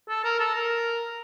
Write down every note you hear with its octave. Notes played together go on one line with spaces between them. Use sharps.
A4
A#4
A4
A#4